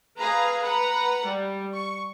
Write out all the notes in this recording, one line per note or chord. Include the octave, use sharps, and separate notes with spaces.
G#4 B4 F5 A#5
B4 F#5 A#5
G3
C#6